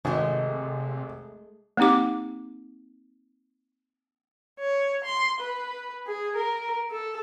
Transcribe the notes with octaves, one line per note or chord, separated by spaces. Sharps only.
G#1 C3 G#3 A3
A#3 C4 D#4 G4 D6
C#5
C6
B4
G#4
A#4
A4